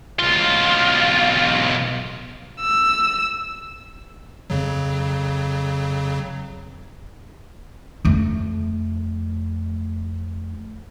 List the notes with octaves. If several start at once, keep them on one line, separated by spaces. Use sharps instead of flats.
B1 F4
E6
F2 C#3 F#3
F2 A3